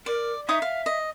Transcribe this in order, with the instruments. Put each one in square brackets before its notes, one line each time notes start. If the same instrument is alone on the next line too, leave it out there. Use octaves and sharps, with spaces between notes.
[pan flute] A#4 [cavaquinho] D5
[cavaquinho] D#4 C#5 D#6 [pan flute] E5
[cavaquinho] F5
D#5